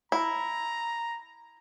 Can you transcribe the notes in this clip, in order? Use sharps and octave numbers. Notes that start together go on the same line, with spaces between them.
E4 A#5